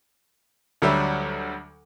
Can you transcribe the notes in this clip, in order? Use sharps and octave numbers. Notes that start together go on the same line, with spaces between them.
D2 F#3 G3 E5